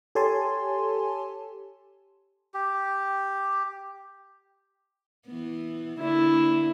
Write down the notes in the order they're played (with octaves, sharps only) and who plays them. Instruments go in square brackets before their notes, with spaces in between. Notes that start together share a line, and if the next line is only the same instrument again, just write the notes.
[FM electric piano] G4 A4 C#5 G#5 A5 C6
[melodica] G4
[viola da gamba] E3 B3
[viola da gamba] D3 A#3 D4 [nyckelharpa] E4